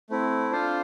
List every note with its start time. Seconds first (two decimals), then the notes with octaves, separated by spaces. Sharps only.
0.10 A3 C4 E4
0.52 D4 F4 A4 C5 F5